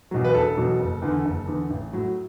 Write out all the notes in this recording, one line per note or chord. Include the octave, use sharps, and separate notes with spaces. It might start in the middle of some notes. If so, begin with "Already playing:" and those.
E2 B2 F#3
B4
E1 A4
E2 B2 F#3
F#1
E2 D3
F#1
E2 D3
A1
A2 F#3